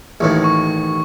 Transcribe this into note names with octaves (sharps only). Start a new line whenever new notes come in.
A1 D#2 A2
C#6